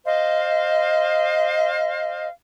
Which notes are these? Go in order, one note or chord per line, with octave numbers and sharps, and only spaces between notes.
C5 D#5 F5